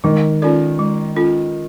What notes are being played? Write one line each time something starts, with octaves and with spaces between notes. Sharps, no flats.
D#3 G#3
C#4 F4 A4 D5
G#3
C#4 F4 A4